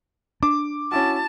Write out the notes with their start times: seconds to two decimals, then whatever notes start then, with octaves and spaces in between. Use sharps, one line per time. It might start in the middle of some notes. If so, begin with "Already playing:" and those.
0.43 D4 D6
0.91 C#4 E4 F#4 A5